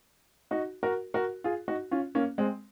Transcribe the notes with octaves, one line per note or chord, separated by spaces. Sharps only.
D#4 F#4
F#4 A#4
F#4 A#4
F4 G#4
D#4 F#4
C#4 F4
A#3 C#4
G#3 C4